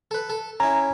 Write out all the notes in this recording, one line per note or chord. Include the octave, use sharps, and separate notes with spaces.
A4 B4
A4
C#4 E4 A#5